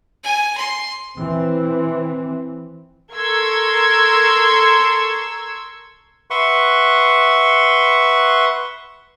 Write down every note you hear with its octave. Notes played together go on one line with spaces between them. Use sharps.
G#5
C6
E3 C4
A4 A#4 C6 C#6 E6 G#6
B4 E5 F#5 C6 C#6